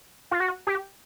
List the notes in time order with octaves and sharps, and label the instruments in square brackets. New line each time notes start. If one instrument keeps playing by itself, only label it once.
[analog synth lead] F4
F#4
G4